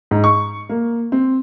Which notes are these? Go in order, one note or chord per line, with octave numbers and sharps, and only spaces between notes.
G#2
C#6
A#3
C4